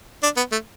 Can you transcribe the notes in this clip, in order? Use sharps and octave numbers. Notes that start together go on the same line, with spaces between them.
D4
B3
A3